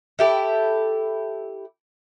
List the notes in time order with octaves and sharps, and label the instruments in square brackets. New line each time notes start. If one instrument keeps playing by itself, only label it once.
[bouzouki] E4 G4 A4